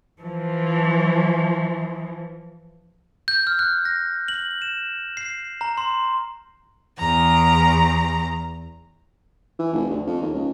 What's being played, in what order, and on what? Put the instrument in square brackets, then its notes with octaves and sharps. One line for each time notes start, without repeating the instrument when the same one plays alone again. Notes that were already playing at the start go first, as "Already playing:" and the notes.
[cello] E3 F3
[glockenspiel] G6
F6
F#6
A#6
F#7
E7
C7
A#5
C6
[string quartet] E2 A#5
[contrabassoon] E3
F1
D2
F2
D#2
C#2